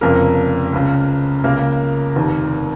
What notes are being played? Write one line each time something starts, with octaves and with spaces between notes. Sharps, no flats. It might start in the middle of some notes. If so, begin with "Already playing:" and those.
F1 F2 C#3 A#3 A#4
C#2 C#3
C#2 C#3 A#3 A#4
F1 D#2 D#3